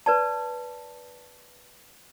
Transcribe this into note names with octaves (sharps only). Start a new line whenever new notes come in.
B4 D5 A5